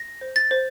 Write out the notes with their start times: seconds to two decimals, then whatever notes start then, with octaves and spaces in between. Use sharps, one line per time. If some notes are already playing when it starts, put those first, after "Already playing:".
Already playing: A#6
0.21 C5
0.36 A6
0.51 C5